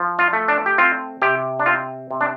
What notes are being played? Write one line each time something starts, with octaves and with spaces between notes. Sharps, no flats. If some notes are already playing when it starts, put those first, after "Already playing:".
Already playing: F3
F4
A3
D4
G4
C4 F4
C3 G4
D4
C4 F4
C3
D4